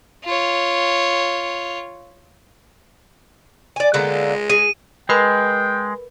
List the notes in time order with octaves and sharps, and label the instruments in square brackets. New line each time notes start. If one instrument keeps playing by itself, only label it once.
[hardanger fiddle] F4 C#5
[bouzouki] D5 G#5
[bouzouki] D3 A#3 B3 [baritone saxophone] G#3
[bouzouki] G#4 [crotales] D#7
[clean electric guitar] G#3 [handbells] A#4 B4 B5 [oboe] G5